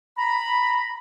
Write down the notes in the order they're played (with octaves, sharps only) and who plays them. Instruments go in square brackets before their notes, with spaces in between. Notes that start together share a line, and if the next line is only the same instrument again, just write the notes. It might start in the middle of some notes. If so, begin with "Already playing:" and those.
[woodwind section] A#5 B5